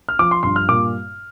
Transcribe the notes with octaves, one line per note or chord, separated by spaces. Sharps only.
F6
F3 D6
C6
G2 C6
F6
A#2 D6